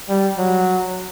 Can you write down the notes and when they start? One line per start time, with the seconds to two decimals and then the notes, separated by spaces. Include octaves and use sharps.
0.09 G3
0.38 F#3